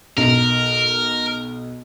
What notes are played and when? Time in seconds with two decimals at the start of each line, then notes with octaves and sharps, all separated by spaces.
0.17 B1 A#4